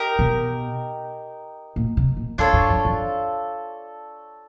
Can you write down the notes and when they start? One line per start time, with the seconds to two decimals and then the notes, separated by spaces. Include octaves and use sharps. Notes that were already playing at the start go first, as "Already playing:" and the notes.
Already playing: D#4 G4 A#4
0.19 B2
1.76 A#2
1.97 C3
2.17 A#2
2.38 G#2 D4 F4 A4 C#5
2.53 G2
2.69 F2
2.85 F2